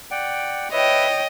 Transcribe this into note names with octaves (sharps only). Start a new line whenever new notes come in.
D5 F#5 G5
B4 C#5 D#5 E5 G5